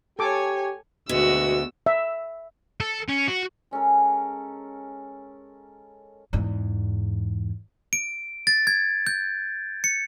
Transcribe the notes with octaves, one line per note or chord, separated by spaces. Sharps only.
G4 A4 C#5 G#5 D6
D2 B2 G#3 F#4 E6
E5
A4
C#4
F#4
G#3 C#4 A4 A#4
E2 G#2
D7
A6
G#6
G6
C#7